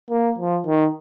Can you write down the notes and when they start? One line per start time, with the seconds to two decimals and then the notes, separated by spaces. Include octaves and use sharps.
0.10 A#3
0.38 F3
0.66 D#3